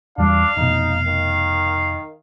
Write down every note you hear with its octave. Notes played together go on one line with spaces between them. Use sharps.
E2 G3 D4 F5
F1 B2 D#4
D#3